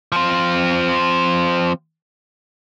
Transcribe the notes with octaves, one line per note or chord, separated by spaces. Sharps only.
F3 C4